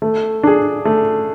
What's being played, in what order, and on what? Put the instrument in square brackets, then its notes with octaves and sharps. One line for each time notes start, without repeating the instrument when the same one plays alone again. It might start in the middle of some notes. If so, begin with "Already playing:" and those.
[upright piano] A3
D4 G#4
A3